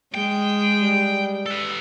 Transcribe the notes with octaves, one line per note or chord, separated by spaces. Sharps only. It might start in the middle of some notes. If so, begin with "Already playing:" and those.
G#3 G5
G3
A4 B4